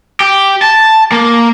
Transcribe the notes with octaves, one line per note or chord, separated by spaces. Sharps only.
G4
A5
A#3